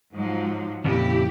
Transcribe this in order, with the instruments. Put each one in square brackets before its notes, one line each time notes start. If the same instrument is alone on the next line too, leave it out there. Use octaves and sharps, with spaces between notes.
[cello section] G#2 F3 F#3
[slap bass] F2 A#2 C#3 [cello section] E4 G4